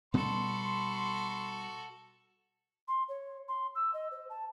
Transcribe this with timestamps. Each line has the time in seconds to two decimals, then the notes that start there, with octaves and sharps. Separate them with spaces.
0.14 B2 G3 B3 F#4 A4 B5 C6
2.88 C6
3.08 C#5
3.48 C6
3.75 E6
3.93 D#5
4.11 C5
4.30 A5